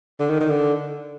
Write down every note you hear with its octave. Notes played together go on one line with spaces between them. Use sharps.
D3
D#3
D#3
D3